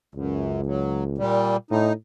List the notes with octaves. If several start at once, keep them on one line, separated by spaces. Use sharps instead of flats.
C#2 F#2
F#3
A#2 G3
A2 D#4